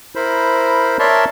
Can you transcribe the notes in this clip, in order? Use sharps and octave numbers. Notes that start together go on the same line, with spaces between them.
E4 A#4 C5 B5
A#4 C#5 D5 E5 A5 C6